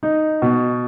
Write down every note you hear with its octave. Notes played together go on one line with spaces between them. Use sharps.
D#4
B2